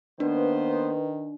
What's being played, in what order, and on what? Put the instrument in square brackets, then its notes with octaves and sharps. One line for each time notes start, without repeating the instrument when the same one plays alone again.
[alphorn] D#3 [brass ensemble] A#3 B3 C5 [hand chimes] D4 [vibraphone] B4